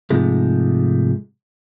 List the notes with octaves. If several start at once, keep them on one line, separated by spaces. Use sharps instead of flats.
G#2 C3 F3 G#3 A3